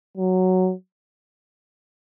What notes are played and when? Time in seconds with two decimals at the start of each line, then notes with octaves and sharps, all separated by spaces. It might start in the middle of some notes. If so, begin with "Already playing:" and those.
0.17 F#3